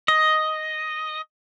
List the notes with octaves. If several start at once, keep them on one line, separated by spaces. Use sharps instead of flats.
D#5